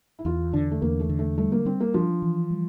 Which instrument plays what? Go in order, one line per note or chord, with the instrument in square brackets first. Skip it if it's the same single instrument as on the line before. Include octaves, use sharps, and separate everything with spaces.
[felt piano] E4
[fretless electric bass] E2 [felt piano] F4
[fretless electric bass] D3 [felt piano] D4
[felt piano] A3
[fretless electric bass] E2 [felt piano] A#3
[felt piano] A3
[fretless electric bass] D3
[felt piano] A3
[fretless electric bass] G3 [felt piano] A3
[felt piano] A#3
[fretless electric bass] G3 [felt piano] C4
[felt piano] A#3
[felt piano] F3 [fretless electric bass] D4
[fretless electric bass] E3
G3